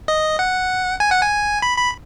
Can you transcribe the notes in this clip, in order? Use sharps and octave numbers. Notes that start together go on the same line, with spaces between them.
D#5
F#5
G#5
F#5
G#5
B5
B5